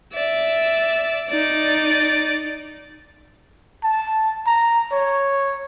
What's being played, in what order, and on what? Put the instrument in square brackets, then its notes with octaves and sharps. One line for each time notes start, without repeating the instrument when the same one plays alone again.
[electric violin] D5 E5
D#4 D5
[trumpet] A5
A#5
C#5